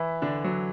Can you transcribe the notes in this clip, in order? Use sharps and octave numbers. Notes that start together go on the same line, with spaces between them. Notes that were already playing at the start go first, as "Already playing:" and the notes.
Already playing: E3 E4
D3 D4
F#3